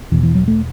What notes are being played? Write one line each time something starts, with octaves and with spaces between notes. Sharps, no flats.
E2 B2 E3
E3
F#3
A3